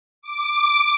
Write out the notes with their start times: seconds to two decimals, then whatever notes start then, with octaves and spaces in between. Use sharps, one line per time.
0.22 D6